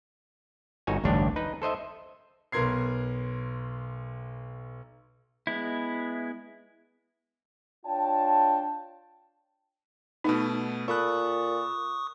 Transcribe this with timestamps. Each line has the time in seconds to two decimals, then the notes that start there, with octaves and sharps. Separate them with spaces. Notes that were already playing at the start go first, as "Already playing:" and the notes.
0.87 G1 D#4 F#4 C#5 G#5
1.04 A1 D2 G2 D4 C#5
1.36 D#4 B4
1.62 A4 C5 D#5 E5
2.52 B1 B3 A#4 C6 G#6 C7
5.47 G#3 B3 E4
7.86 D4 F4 C#5 G5 A5
10.24 B2 A3 B3 D#4
10.88 A#2 A4 B5 C#6 D#6 F#6